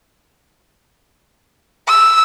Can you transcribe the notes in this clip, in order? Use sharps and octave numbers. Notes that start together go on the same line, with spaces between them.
E6